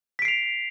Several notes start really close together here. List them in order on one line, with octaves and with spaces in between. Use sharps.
B6 D7 C7 F7